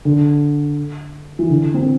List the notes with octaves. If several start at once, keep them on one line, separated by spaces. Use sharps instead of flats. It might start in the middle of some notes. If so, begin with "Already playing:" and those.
D3
E3
D3
C4